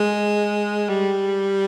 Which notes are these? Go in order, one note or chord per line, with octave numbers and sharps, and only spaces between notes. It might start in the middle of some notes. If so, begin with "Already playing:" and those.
Already playing: G#3
G3